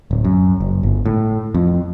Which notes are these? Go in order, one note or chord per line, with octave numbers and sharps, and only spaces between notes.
D1
F#2
F#1
G1
A2
F2